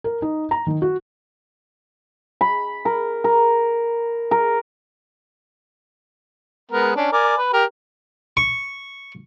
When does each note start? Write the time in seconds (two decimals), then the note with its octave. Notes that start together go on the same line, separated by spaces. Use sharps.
0.04 A#4
0.22 D#4
0.51 A#5
0.67 D#3
0.82 F#4
2.41 B5
2.85 A#4
3.24 A#4
4.31 A#4
6.71 G#3 B3 A#4
6.96 C#4 D4
7.12 A#4 D5 G#5
7.38 B4
7.53 G4 A#4
8.37 C#6